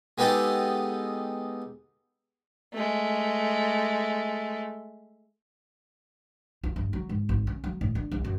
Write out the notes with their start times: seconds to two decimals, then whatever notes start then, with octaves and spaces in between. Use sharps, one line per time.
0.18 G#3 B3 D#4 G4 A4
2.73 G#3 A3
6.64 F4
6.76 G2
6.93 F#3
7.09 G#2
7.29 G#1
7.47 C#4
7.64 F#3
7.81 A2
7.95 D4
8.12 C2
8.25 F#2